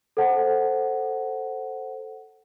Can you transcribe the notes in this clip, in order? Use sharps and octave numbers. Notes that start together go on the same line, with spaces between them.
A4 C5 F#5 A5